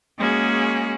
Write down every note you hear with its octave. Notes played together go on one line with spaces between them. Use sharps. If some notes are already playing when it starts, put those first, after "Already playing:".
G#3 A#3 C#4 F#4 G#4